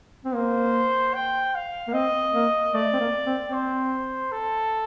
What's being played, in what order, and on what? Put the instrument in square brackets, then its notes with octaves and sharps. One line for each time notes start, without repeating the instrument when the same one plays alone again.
[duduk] C4
[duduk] A#3 [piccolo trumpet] C5
[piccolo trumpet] G5
F5
[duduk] A#3
[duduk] C4 [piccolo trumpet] D#5
[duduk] A#3
[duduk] A3 [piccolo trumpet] D5
[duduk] C4
A#3
C4
C4
[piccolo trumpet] C5
A4